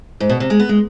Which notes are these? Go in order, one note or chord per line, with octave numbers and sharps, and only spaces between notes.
G#2
B2
C3
G#3
B3
G#3